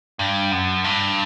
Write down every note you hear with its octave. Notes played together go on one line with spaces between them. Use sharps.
G2
F#2
G2